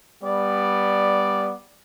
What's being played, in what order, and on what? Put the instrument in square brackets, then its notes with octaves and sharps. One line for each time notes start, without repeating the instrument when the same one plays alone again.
[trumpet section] G3 B3 D5